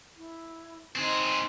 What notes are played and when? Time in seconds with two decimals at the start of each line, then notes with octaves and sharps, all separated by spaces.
0.17 E4
0.95 C4 D#4 G#4 C5 C6